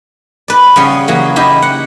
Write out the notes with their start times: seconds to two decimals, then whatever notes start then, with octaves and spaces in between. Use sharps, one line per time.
0.48 B4 D5
0.76 C#3 G3 B3 C#4
1.08 C#3 E3 F#3 A#3
1.36 E4 G4 D#5 F5
1.62 F#5